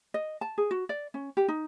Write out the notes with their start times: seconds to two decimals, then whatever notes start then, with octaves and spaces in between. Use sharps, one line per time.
0.14 D#5
0.41 A5
0.58 G#4
0.71 F#4
0.89 D5
1.14 C#4
1.37 G4
1.48 D#4